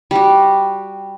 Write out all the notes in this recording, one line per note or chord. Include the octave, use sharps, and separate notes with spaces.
G3 F#4